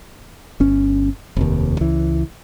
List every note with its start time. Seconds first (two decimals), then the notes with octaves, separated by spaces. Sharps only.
0.60 G1 C#4
1.36 F1 D#2
1.80 C#2 E3